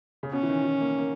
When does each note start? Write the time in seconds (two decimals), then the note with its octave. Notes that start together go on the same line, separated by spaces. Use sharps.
0.23 C#3
0.32 B2 C#4
0.43 E3
0.49 D#3
0.64 E3
0.81 A#3
0.98 A#3